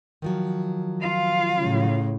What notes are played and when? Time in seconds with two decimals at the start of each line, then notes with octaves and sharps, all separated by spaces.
0.22 D#3 F3 F#3
1.01 F4 F5
1.58 A2 C#3